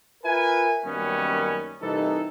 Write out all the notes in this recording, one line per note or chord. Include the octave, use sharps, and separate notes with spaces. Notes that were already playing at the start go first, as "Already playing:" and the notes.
F4 A#4 B4 E5 G#5
F#2 D#3 G3 A#3 B3 C#4
C2 C3 E3 D#4 A4